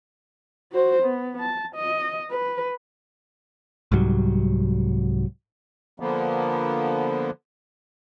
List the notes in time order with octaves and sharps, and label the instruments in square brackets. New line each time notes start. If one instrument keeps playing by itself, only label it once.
[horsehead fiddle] F#4 C5
B3
A5
D#5
B4
[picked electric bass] C2 G#2 F#3 G3
[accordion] D3 F3 A#3 B3